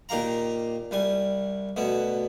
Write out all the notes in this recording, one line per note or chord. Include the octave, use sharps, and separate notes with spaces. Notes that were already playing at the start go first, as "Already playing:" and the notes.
A#2 D#3 G4 F5 A#5
C2 G3 G#5
D2 B2 B3